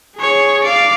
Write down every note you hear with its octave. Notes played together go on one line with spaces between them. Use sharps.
G#4 C#5
D5 F5